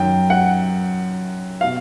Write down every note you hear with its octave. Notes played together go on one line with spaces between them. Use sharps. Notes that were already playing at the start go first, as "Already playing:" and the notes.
Already playing: F#2 D#3 G5
F#5
B2 F5